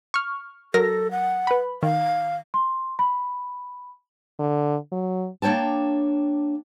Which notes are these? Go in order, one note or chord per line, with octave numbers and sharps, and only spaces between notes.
C#6 F6
F#3 A4 A#4 A#6
F#5
B4 B5
D#3 F5
C6
B5
D3
F#3
A#3 D4 C#5 G5 A5